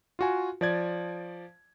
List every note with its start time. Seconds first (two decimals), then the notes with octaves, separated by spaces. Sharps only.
0.19 F4 F#4 G#5
0.61 F3 D5 G#6